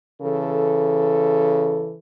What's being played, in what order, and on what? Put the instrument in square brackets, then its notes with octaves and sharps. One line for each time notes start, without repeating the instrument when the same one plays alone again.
[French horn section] C#3 E3 A4